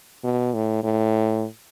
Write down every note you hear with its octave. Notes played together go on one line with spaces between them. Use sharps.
B2
A2
A2